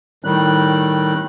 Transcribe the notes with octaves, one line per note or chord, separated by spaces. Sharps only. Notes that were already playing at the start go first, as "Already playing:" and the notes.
A2 D#3 G3 F#6